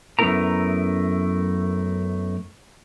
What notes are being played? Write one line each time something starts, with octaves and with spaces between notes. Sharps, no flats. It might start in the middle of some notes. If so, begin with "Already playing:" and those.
F#2 A3 B3 E4 A#4 A#5